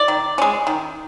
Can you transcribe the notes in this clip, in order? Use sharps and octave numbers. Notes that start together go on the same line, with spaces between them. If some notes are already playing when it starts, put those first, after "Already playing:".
Already playing: D5
D#3
G#3 C#4
D#3